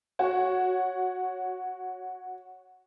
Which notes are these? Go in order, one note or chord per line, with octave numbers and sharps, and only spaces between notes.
F#4 C#5